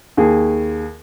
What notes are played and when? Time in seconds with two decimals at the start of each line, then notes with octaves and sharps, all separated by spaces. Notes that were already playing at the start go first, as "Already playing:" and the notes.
0.17 D#2 G#4